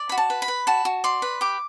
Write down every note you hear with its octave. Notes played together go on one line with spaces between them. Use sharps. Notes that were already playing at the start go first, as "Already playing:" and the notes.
Already playing: D5
F#4 B5
A5
B4
B5
B4
F#4 A5
F#4
D5 C6
B4
G4 D6